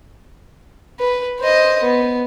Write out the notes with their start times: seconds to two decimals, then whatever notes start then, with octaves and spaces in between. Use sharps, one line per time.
0.99 B4
1.41 C5 D#5
1.83 B3